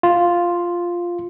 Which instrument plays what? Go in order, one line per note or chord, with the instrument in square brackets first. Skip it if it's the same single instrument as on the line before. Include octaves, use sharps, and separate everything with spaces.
[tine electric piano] F4